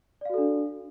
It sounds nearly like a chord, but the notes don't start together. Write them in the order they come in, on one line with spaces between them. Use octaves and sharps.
D5 F5 F#4 A4 D4